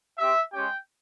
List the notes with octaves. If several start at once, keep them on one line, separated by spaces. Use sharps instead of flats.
C4 G4 E5
G#3 C#4 G4 G5